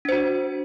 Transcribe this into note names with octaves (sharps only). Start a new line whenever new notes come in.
D4 F#4 C5